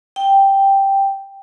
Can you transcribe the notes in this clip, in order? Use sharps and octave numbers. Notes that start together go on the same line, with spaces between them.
G5